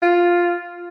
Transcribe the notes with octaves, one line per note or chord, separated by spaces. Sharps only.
F4